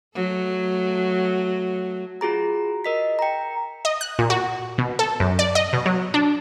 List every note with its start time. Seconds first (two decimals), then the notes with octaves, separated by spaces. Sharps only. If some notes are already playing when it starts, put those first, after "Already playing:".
0.15 F#3 A3
2.21 F4 F#4 G#4 A#5
2.84 A#4 D#5 B6
3.19 G5 A#5
3.85 D#5
4.01 F#6
4.19 A#2
4.30 F#4
4.78 B2
4.99 A4
5.20 F#2
5.39 D5
5.55 D#5
5.73 B2
5.86 F#3
6.14 D4